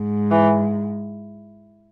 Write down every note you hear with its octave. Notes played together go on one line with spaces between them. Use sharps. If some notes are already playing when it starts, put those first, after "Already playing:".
Already playing: G#2
E3